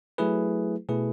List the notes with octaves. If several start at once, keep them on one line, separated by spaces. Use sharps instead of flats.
F#3 A3 E4 G#4 B4
B2 A3 E4 G#4 B4